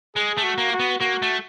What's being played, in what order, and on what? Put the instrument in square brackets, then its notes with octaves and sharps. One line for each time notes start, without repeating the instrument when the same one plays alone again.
[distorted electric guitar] G#3 [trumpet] G#4
[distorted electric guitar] A3
[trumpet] F#4
[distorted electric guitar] A#3
[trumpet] F#4
[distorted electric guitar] B3
[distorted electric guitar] A#3 [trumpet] F#4
[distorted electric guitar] A3